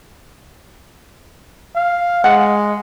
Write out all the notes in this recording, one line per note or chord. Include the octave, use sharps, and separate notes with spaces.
F5
G#3 F#5